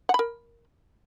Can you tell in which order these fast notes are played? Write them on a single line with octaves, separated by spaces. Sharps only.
F#5 B5 A#4